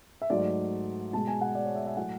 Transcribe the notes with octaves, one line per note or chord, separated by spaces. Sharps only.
E5
G#2 F#3 A3 D5
B2 G#3 A5
G#5
F#5
D5
C#5
E5
E5
A2 F#3 A3 F#5